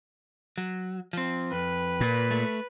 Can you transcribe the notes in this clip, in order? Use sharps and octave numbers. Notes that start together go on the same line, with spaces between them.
F#3
F3 C4
F2 B4
A#2
A3